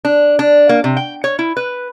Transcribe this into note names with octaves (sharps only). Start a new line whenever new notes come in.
D4
D4
A#3
C3
G5
C#5
E4
B4